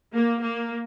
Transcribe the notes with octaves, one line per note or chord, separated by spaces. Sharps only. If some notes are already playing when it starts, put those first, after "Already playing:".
A#3
A#3